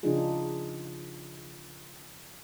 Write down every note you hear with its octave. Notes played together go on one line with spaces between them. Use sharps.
C#3 F3 D4 D#4 F4 G#4